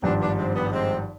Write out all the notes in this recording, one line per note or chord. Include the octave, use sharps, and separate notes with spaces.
G#1 G2 F3 B3 D4
B3 D4
G#3 C4
G3 B3
G#3 C4